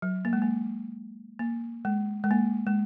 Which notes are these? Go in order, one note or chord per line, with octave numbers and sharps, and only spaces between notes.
F#3
A#3
G#3
A#3
A#3
G#3
G#3
A#3
G#3